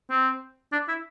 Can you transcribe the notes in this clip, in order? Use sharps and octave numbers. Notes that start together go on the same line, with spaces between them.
C4
D4
E4